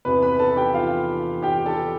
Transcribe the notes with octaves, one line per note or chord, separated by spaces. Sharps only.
E2 C3 E3 B3 B4 B5
B4 B5
A4 A5
G4 G5
F4 F5
G4 G5
A4 A5